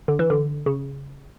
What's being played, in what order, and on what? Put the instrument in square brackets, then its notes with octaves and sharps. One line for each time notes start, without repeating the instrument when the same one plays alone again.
[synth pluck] D3
E3
D3
C#3